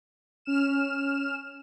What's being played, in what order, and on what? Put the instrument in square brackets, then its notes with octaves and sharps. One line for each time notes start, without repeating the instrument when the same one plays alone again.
[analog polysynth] C#4 F6 E7